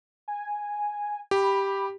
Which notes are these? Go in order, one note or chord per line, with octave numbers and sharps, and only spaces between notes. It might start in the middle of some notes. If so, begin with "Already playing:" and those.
G#5
G4 B5